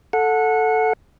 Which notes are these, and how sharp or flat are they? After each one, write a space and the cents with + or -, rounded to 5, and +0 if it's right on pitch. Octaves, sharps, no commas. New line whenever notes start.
A4 +0 F#5 -20